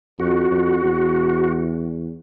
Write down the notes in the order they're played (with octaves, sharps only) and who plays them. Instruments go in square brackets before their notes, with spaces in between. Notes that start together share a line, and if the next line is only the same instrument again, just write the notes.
[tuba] F2 [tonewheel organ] F#4
[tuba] F2
E2